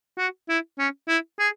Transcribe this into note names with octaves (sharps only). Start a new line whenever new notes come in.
F#4
E4
C#4
E4
G#4